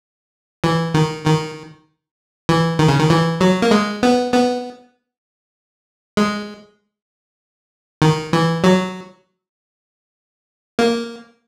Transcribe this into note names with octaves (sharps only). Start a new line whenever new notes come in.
E3
D#3
D#3
E3
D#3
C#3
D#3
E3
F#3
A#3
G#3
B3
B3
G#3
D#3
E3
F#3
A#3